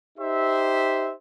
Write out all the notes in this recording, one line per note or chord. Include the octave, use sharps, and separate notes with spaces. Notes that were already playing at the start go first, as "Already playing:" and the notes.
D#4 G4 C5 E5